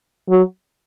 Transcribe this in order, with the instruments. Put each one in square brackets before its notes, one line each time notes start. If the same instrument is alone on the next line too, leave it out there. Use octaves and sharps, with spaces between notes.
[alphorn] F#3